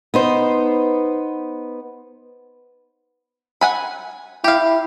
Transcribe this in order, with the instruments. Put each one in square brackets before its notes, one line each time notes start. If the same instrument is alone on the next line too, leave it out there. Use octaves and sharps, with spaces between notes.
[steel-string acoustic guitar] B3 D#4 C5
[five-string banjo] F#5 G#5 B5
[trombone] E4 [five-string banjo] G4 F5